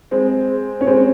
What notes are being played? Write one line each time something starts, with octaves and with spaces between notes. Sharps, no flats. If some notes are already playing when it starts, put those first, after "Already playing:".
G#3 C4
C#4
G#3 C4